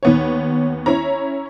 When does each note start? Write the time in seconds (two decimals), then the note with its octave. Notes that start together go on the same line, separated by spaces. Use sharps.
0.03 D#2 B3 C#5
0.86 C#4 E4 C#5 A#5